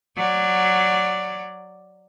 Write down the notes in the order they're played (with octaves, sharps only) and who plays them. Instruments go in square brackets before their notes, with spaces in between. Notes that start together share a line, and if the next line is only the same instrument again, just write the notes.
[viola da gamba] F#3 D5